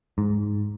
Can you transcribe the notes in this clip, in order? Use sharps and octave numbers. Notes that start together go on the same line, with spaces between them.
G#2